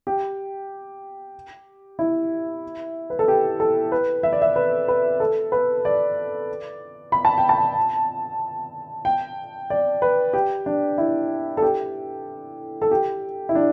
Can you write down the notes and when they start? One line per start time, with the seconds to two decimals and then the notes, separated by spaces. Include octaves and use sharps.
0.07 G4
1.99 E4
3.10 B4
3.19 A4
3.28 G4
3.60 A4
3.92 B4
4.23 E5
4.32 D5
4.42 E5
4.56 B4
4.88 B4
5.20 A4
5.52 B4
5.85 D5
7.12 B5
7.25 A5
7.38 G5
7.49 A5
9.05 G5
9.70 D5
10.02 B4
10.33 G4
10.66 D4
10.98 E4
11.57 A4
11.62 G4
12.82 A4
12.91 G4
13.49 E4
13.55 D4